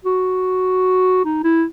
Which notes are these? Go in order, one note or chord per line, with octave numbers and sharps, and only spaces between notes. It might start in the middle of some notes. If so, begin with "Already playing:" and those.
F#4
D#4
E4